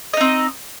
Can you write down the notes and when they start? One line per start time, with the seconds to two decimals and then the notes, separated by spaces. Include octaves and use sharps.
0.13 D#5
0.17 D#4
0.21 C4